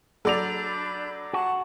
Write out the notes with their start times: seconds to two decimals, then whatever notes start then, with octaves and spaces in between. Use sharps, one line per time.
0.25 F#3 D4 A4 D5 B5 G6 F7
1.33 F#4 F#5 A5